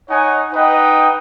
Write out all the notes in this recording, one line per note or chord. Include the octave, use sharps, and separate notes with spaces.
D#4 C#5 F#5 G#5
D#4 B4 D#5 F#5 G5